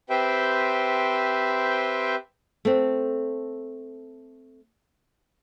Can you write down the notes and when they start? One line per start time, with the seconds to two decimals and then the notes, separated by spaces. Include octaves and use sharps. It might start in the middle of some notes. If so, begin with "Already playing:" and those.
0.10 C4 G4 B4 C5 E5 G5
2.65 A3 C4